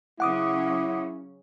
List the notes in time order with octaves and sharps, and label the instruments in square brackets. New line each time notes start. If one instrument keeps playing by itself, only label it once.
[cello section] C#3 F#3 C#4 [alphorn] E4 [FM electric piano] F#5 D6 D#6